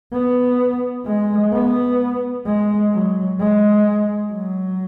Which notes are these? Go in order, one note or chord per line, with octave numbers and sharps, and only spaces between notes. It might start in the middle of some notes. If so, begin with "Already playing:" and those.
B3
G#3
B3
G#3
F#3
G#3
F#3